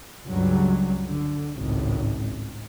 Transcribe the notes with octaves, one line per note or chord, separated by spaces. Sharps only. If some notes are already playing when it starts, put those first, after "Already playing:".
C#2 G2 F#3
D3
G#1 C#2 A2